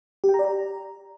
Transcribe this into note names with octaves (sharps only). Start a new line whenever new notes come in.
G4
G5
A#5
D5
A#5